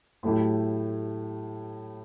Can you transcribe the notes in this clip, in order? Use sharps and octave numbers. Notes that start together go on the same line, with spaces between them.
A2 F#3 A3 E4 G4